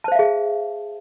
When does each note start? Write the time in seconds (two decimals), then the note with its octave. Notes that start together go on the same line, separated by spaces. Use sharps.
0.04 A5
0.08 C5
0.12 F5
0.15 E5
0.19 G#4